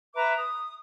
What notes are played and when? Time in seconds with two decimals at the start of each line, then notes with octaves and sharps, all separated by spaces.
0.15 B4 E5 A#5 D6
0.36 D#6